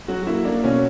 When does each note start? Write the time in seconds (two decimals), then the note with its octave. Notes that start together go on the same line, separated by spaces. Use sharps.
0.08 F#3 F#4
0.23 F#4
0.27 A#3 E4
0.45 A#3 D4
0.64 B2 C#4